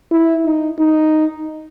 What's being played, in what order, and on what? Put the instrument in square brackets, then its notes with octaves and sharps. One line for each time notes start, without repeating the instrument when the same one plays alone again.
[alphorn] E4
D#4
D#4